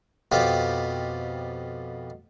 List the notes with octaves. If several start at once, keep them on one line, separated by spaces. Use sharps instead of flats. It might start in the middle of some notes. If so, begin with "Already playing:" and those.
F2 B2 F4 G4